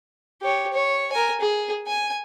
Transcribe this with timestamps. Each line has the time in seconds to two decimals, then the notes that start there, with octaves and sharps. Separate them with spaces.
0.42 G4 C#5
0.73 C#5
1.12 A#4 G#5
1.41 G#4
1.87 G#5